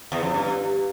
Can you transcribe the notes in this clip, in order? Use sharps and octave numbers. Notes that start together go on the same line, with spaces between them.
E2
F2
G2